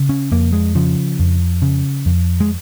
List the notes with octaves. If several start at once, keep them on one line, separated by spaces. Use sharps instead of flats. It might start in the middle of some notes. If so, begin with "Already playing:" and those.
Already playing: C#3
C#4
F2 A#3
G#3
C#3 F3
F2
C#3
F2
G#3